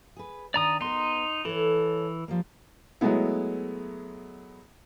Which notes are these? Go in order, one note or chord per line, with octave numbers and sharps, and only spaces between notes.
G#4 B4
D#3 D4 D5 A#5 D#6
B3 D#4 A#4 C6
E3 A4 C#5
F3 G3 A#3
F#3 G#3 A3 B3 E4